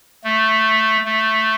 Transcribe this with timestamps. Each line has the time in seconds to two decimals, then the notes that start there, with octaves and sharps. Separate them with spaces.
0.24 A3
1.05 A3